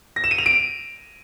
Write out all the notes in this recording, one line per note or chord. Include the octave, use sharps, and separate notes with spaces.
A#6
E7
D#7
F7
D7